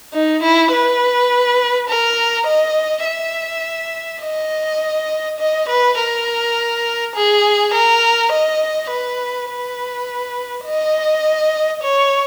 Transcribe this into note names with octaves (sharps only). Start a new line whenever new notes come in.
D#4
E4
B4
A#4
D#5
E5
D#5
D#5
B4
A#4
G#4
A#4
D#5
B4
B4
D#5
C#5